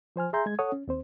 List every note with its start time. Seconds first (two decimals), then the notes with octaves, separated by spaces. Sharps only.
0.16 F3 C5 G#5 F6
0.33 G#4 E5 G#5 A#5 C6 G6
0.46 G#3 G#6
0.59 A4 C#5 F#5 D#6
0.72 C#4
0.88 D#2 C4 C5